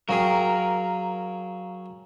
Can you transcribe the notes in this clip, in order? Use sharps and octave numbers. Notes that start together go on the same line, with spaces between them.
F#3 C#4 G#4 A#4 F5 G5 A#5